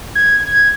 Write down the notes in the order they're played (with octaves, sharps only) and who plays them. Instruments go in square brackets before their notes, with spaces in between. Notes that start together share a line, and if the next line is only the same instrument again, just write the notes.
[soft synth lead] G#6